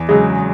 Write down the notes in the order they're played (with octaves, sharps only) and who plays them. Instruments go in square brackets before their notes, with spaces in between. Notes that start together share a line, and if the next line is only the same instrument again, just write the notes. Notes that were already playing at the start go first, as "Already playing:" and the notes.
Already playing: [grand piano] E2
[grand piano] C#3 F#3 [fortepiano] G#3